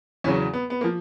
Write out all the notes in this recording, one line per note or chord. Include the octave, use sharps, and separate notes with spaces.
E2 C#3 F#3 C#4
B3
B3
A#3
F3